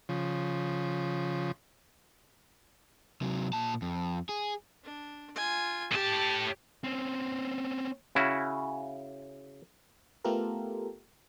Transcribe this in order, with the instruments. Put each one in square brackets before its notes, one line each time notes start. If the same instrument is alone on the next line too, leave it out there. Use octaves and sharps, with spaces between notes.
[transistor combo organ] C#3 F3
[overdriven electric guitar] C3 F#3
A#2 A5
F2
G#4
[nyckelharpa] D4
F4 G#5
[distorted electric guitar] A2 A5 [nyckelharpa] G4
[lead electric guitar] C4 C#4
[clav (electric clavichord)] C#3 C#4 E4 F#4
[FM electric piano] A3 B3 F4 G4 A4 A#4